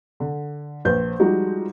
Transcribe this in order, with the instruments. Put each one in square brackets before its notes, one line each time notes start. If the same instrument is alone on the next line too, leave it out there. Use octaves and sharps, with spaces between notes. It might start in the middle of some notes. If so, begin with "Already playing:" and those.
[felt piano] D3
A#1 B4 C5 G6
F3 G3 G#3 D#4 F#4